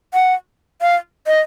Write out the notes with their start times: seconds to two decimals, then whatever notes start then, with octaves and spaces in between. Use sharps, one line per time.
0.14 F#5
0.81 F5
1.27 D#5